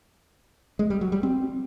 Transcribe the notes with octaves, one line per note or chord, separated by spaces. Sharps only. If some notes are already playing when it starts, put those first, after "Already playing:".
G#3
G3
F#3
G3
C4